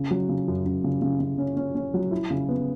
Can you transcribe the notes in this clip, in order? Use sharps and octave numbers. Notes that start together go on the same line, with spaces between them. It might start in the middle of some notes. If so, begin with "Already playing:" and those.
Already playing: C#3
F#3
C#3
F#2
F#2
C#3
C#3
C#3
C#4
C#4
C#4
F#3
E4
C#3
B3